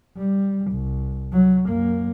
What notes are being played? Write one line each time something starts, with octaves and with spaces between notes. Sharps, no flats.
G3
C2
F#3
F#2 A#3